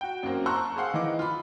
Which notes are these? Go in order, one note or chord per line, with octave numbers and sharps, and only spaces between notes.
F#4 G5
F#2 F#3 A#3 C4
A5 A#5 C6 C#6 E6 F#6
G#4 C5 F5 F#5
D#3 E3 D#5 D6
F4 B5